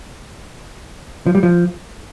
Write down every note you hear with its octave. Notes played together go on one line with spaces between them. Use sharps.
F3
G3
F3